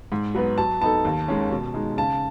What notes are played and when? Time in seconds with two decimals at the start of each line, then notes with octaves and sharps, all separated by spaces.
0.12 G#2
0.35 F#3 B3 F#4 B4
0.58 F#3 A5
0.81 B3 D#4 A4 A5
1.05 D#2
1.28 D#3 G#3 C#4
1.51 B2
1.74 G#3 D#4
1.98 C#3 A5